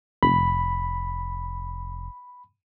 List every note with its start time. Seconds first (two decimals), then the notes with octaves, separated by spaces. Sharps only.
0.23 F1 B5